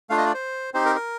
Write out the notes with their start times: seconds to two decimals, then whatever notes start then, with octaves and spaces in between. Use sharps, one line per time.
0.10 A3 D4 F4 F5
0.18 D#5
0.26 D5
0.34 C5
0.74 C4 D#4 G4 C5
0.85 A#4
0.96 A#4